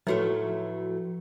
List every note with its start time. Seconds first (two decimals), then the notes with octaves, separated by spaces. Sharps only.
0.07 A2 F3 F#3 A3 F#4